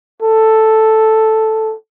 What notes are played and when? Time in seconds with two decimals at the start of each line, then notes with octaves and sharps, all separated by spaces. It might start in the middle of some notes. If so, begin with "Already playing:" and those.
0.22 A4